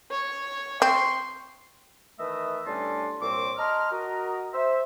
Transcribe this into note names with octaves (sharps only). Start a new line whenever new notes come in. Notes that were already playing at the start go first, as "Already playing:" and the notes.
C#5
C4 C6 C#6
D#3 E3 A3 B4 D#5 E5
A2 G3 C#4 D4 A5 C6
C2 A#2 C4 C#5 D6
D#5 A5 A#5 C6 F6
F#4 A#4 D#5
C5 E5